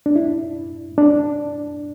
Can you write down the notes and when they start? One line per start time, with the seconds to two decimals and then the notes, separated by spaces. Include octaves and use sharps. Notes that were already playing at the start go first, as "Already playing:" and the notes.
0.06 D4
0.16 E4
0.98 D4